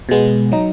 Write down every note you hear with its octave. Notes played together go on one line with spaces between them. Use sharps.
B2 G#3 B3
F#3 D#4